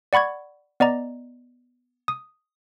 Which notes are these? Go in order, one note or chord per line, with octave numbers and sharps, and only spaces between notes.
D5 F#5 B5 C#6 G#6
B3 D5 D#5 A#5
D#6